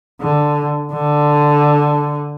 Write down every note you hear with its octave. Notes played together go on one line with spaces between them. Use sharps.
D3
D3